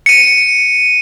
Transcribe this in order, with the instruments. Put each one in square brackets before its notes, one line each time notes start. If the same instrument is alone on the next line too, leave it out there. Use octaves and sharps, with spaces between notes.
[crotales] C#7 D#7